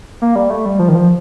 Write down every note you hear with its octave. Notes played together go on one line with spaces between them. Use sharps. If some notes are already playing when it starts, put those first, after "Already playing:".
A#3
G3
A3
G3
F3
D#3
F3